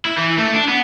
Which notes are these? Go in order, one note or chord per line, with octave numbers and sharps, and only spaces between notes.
E4
E3
A3
D4
B3